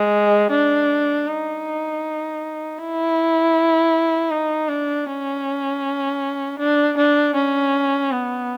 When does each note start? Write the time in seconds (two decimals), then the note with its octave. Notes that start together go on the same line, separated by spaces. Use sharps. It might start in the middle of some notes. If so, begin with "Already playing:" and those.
Already playing: G#3
0.50 D4
1.27 D#4
2.78 E4
4.31 D#4
4.69 D4
5.07 C#4
6.59 D4
6.97 D4
7.35 C#4
8.12 B3